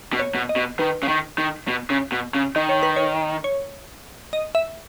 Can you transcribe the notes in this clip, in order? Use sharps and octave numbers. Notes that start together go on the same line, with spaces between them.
B2
C#5
B2
D#5
B2
D#3 B4
C#3
D#3
D#3
B2
C#3
B2
C#3
D#3 D#5
C#5
B4
C#5
C#5
D#5
E5